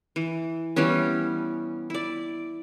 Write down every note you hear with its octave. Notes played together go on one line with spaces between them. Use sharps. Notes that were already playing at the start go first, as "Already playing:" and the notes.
E3
E3 G3 B3 C#4
E4 D5